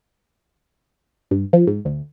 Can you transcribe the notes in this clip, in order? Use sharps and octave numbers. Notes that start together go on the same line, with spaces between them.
G2
F3
G#2
D2